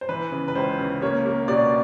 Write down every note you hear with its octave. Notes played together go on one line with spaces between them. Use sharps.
C5
E3 B4
C#3
B4
C#2 C5
C#3
A#3 C#5
A#3
B2 D5